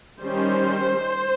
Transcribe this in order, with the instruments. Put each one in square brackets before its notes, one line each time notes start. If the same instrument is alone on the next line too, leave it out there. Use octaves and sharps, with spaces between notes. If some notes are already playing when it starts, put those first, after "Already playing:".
[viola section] D#3 G3 C#4 C5